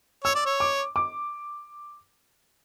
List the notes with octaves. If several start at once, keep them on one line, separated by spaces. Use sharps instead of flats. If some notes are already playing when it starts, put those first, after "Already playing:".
C#5 E6
D5
C#5
D6
D6